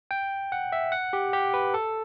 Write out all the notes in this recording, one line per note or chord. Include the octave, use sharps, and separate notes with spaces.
G5
F#5
E5
F#5
G4
G4
B4
A4